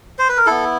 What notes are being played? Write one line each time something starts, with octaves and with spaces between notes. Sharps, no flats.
C5
B4
A#4
B3 E4 A4